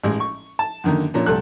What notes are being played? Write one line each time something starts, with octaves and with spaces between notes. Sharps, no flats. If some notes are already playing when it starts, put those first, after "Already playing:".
A1 G#3
C#6
A5
F#2 D3 D#3 A#3
A#2 F3 A#3 C#4 D4
C2 G3 A3 A4 F#6